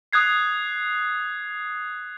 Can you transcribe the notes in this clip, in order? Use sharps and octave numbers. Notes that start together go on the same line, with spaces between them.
D#6 F#6 G#6 C7